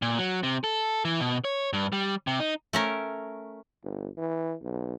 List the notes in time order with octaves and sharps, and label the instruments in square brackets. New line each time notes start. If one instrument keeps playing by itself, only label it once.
[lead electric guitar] A#2
F#3
C3
A4
E3
B2
C#5
G2
G3
C3
D#4
[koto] A3 C#4 A#4
[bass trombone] G1
E3
B1